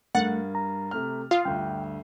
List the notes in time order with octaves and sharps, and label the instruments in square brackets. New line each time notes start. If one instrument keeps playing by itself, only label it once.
[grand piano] G2 A#4 A6 [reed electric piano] A3 [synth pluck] F#5
[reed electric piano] A#5
[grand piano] C3 A3 F6
[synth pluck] F4 [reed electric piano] F5 [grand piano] D#6 F6 C7
[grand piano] D2 G2 [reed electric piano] G5